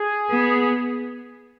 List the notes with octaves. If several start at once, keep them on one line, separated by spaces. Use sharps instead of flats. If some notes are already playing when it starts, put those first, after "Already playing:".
Already playing: G#4
B3